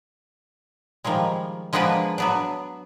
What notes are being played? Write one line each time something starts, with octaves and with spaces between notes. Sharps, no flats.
D#3 F3 G3 G#3
F3 G#3 A#3 B3 D4 B4
F#3 B3 D4